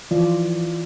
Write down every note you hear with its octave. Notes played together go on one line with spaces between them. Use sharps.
E3 F3 F4 D5